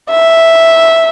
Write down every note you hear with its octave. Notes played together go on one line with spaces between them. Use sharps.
E5